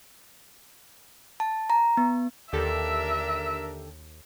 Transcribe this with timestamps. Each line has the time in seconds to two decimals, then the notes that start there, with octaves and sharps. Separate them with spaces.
1.40 A5
1.70 A#5
1.97 B3
2.53 D#2 D3 D4 G4 A4 A#4 E5